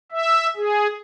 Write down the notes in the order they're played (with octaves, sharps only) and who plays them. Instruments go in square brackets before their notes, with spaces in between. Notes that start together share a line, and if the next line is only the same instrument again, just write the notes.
[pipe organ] E5
G#4